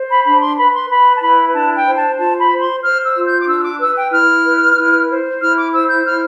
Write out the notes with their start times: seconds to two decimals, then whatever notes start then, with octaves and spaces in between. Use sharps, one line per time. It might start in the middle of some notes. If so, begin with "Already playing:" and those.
Already playing: C5
0.09 B5
0.25 D4 B5
0.41 C6
0.57 B4 B5
0.73 C6
0.89 B4 B5
1.16 A5
1.21 E4 B5
1.54 D4 A5
1.76 G5
1.86 C5
1.97 A5
2.18 F4 A5
2.39 B5
2.51 C5
2.61 C6
2.82 C5 F6
3.04 E6
3.15 F4
3.26 G6
3.41 D6
3.47 D4 E6
3.59 E6
3.64 D6
3.79 B4 E6
3.95 G5
4.11 E4 F6
4.44 B4
4.77 E4
5.08 C5
5.40 E4 F6
5.56 D6
5.72 C5 E6
5.89 G6
6.05 E4 F6